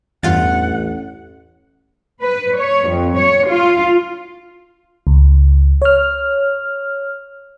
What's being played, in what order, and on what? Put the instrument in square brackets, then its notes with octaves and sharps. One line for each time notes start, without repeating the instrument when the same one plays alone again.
[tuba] A1 [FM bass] E2 [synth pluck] G2 F4 A6 [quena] F#5
[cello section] B4
C#5
F2
C#5
F4
[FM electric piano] C#2
C#5 F6